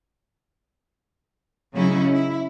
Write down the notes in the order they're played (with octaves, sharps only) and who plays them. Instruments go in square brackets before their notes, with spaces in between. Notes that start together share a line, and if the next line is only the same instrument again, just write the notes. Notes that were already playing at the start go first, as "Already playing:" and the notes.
[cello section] C#3 F#3 C#4 D#4 E4
E4